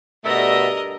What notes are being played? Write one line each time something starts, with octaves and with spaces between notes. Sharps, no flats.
G2 B2 A3 A4 A#4 D#5 E5 A5